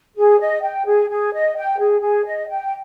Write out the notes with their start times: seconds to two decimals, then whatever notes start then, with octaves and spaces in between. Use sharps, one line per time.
0.16 G#4
0.40 D#5
0.62 G5
0.86 G#4
1.09 G#4
1.33 D#5
1.56 G5
1.78 G#4
2.01 G#4
2.25 D#5
2.49 G5